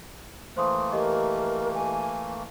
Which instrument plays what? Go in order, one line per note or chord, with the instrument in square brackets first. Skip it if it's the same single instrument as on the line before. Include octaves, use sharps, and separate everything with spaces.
[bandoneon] E3 A3 A#3 [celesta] C5 C6 D#6
[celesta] G4 D#5 [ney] A#4
[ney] G#5